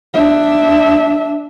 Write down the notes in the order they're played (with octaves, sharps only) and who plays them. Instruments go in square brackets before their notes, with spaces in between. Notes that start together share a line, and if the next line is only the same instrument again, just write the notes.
[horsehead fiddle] D4 E5